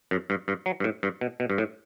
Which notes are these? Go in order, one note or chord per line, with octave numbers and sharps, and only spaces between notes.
F#2
G2
G2
F#3
G2
A2
G2
B2
B2
G2
A2